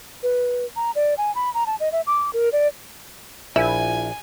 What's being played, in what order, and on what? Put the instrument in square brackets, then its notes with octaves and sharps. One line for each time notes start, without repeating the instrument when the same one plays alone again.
[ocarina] B4
A#5
D5
G#5
B5
A#5
A5
D#5
E5
D6
A#4
D5
[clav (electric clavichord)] A#1 [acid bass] E4 [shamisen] E5 [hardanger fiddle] G#5